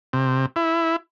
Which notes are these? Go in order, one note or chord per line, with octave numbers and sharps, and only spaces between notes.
C3
E4